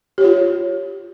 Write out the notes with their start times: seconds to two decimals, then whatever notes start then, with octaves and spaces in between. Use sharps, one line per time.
0.18 G4
0.21 C#5
0.24 F4